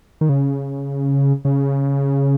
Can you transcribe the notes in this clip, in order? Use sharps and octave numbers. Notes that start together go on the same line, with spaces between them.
D#3
C#3
C#3